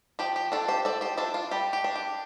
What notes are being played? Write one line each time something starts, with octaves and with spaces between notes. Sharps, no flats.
F3 G4
G4
D4 F4 A4
G4 C5
F3 A4 D5
G4 C5
D4 F4 A4
F4
G3 G4
G4
D4
G4